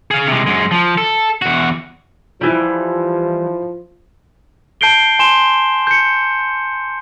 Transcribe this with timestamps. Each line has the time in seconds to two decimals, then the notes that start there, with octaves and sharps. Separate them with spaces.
0.11 G#4 F5
0.28 C3 G#3
0.47 F#2 G#3
0.71 F3
0.98 A4
1.42 E2 F#4
2.41 E3 F3 G3 E4 F4
4.81 A5 G6 C7 D7 G7
5.19 G#5 C6 E7 G7
5.87 G6 C#7